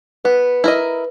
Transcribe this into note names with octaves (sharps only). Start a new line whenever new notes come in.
B3 B4
E4 A#4 D#5